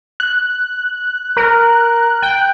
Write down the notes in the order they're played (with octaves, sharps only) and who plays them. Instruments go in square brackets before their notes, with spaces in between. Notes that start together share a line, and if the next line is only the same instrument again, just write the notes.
[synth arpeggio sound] F#6
[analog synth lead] A#4
G5